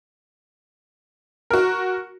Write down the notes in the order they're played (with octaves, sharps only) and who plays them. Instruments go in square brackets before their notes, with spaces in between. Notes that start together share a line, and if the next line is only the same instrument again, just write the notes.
[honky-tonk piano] F#4 A#4